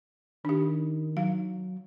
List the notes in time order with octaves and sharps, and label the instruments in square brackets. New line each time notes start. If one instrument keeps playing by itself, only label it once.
[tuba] D#3 [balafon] D4 G4
[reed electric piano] F#3 [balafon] F5